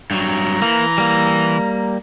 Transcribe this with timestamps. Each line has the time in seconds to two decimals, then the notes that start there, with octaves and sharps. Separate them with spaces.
0.11 G2 F#3 A#5
0.62 E3 A#3
0.98 G3 A#3